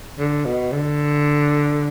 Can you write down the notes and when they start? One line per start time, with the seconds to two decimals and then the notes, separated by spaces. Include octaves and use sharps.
0.19 D3
0.46 B2
0.72 D3